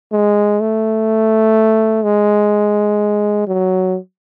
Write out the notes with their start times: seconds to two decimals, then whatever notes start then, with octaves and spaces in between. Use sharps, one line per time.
0.12 G#3
0.60 A3
2.04 G#3
3.48 F#3